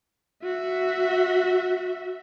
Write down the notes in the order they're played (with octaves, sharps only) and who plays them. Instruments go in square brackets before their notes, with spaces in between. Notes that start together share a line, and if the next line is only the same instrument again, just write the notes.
[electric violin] F#4 E5